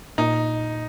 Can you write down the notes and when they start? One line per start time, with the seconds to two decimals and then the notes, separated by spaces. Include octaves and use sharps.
0.18 A#2 D#4